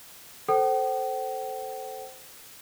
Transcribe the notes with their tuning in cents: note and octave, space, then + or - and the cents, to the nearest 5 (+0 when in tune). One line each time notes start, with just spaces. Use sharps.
A4 +0 C5 +0 G5 -45